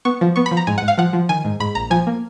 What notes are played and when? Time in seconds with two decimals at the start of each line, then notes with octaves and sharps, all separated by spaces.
0.05 B3 C#6
0.21 F3
0.36 B3 C#6
0.46 B5
0.51 F3
0.57 A#5
0.67 G#2 G#5
0.78 F#5
0.82 G#2
0.88 F5
0.98 F3 F#5
1.13 F3
1.29 D#3 G#5
1.45 G#2
1.60 G#2 B5
1.75 A#1 A#5
1.90 F3 G#5
2.07 A#3